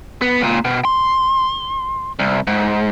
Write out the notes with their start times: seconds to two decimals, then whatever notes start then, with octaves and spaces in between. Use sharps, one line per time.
0.22 B3
0.42 C#2 A#2
0.65 B2
0.85 C6
2.19 C2
2.47 G#2